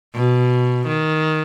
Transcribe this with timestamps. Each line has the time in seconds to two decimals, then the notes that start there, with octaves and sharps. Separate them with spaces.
0.16 B2
0.88 D#3